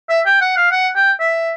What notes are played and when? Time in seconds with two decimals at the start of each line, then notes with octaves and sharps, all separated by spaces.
0.10 E5
0.26 G5
0.41 F#5
0.57 F5
0.72 F#5
0.96 G5
1.20 E5